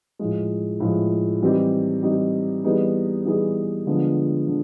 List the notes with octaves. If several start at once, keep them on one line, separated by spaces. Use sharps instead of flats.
A2 F3 G#3
A2 F3 G#3
E3 G3 C4 D#4 G4
E3 G3 C4 D#4 G4
E3 G3 B3 D#4 G#4
E3 G3 B3 D#4 G#4
D3 F3 G#3 B3
D3